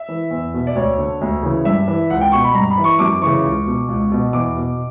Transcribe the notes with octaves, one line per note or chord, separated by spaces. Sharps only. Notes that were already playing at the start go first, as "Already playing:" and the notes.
Already playing: E5
E3
E2
B2
D5
D2 C#5
D3
D2
C#3 E3
G2 E5
E3
C#2 F#5
G5
B2 C#6
B5
G2 A#5
B5
E3
C#6
F#2 D6
C#3 E3 C#6
C#2
B2
C#2
B2
E2 D6
B2